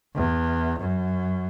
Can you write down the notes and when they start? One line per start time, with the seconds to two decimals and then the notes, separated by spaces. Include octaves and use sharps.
0.16 E2
0.79 F#2